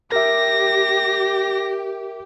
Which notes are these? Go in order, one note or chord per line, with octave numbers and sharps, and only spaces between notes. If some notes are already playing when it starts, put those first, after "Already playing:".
G4 A#4 E5 A#6